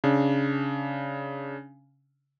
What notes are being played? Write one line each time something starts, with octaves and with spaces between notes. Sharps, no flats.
C#3 D4